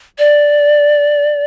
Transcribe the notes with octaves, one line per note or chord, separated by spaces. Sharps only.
D5